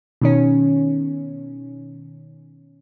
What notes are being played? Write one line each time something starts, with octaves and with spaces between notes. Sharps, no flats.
B2 D#3 C#4